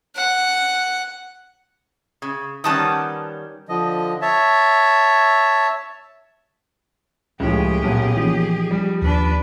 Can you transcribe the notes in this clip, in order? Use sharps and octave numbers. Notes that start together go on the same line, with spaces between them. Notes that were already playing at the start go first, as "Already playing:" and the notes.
F#5
C#3
D#3 G3 B3 C#4 A5 D#6
D3 F3 D#5
C#5 E5 A5
C#2 A2 F3 F#3 G#3 G4 G#4
B1 A#2 A#3 B3 C#4
A#2 E3 F3 B3 C#4 D#4
G3
D#2 D4 B4